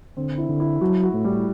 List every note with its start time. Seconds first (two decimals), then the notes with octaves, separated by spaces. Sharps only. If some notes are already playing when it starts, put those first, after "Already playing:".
0.17 D3 C4
0.38 E4
0.49 D3
0.60 E4
0.81 F#3 F#4
1.03 F#4
1.13 A2
1.24 G3